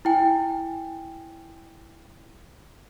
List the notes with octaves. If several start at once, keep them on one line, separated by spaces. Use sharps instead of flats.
E4 G5 G#5